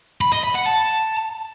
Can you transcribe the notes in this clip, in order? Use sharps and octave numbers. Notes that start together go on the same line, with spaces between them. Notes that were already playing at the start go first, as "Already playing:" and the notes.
B5
D#5
B5
F#5
A5